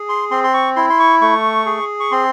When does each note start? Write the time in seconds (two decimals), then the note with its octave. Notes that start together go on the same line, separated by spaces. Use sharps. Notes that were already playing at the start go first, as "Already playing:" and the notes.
Already playing: G#4
0.09 C6
0.31 C4 C6
0.44 C6
0.54 C#6
0.76 E4 C6
0.90 C6
0.99 C#6
1.21 A3 C#6
1.66 G#4
2.00 C#6
2.12 C4 C6